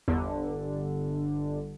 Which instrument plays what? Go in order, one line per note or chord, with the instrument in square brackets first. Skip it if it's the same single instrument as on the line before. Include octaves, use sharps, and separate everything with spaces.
[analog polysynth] G1 D3 [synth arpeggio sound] E2